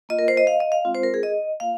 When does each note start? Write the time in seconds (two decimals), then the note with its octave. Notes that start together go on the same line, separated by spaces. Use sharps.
0.09 A#3 F4 D#5
0.19 A#4
0.28 C5
0.37 D#5
0.47 F5
0.60 D#5
0.72 F5
0.85 G#3 C4 F4
0.95 C5
1.03 A#4
1.14 G#4
1.23 D#5
1.60 A#3 F4 F5